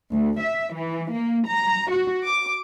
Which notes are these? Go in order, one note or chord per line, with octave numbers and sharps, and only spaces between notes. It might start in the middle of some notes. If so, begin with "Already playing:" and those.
D2
E5
E3
A#3
A#5
F#4
D6